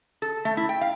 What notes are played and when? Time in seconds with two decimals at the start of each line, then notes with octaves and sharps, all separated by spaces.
0.22 A4
0.45 A3
0.57 E4
0.69 G5
0.81 F5